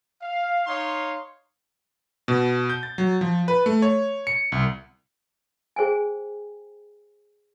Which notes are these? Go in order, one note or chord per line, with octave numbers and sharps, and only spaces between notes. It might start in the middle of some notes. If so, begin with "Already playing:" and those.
F5
D#4 C#5 F5 C6
B2
G6
A6
F#3
F3
B4
A3
C#5
C#7
C2
G#4 C5 G5 G#5